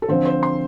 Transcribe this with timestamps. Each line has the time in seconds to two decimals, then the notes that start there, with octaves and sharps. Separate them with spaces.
0.02 A4
0.08 D3 F3 C4 C5
0.25 C5
0.43 C6